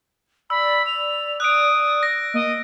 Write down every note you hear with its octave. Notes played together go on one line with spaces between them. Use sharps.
D5 B5 E6
F7
D#6 F#6 D7
A#6
A#3 D#5